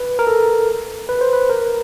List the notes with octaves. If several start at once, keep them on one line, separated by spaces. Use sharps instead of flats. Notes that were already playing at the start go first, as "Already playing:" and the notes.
Already playing: B4
A#4
A4
B4
C5
B4
A#4